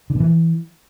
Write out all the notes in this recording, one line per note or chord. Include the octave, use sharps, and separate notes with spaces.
D3
B2
E3